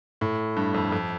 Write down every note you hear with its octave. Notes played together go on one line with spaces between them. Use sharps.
A2
G2
F2
F2